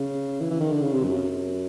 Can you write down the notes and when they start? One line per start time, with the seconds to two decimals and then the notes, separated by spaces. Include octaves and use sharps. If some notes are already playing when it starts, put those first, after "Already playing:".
Already playing: C#3
0.40 E3
0.50 E3
0.60 D#3
0.72 D3
0.82 C#3
0.92 C3
1.03 F#2